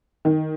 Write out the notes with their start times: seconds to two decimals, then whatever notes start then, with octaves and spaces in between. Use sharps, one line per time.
0.25 D#3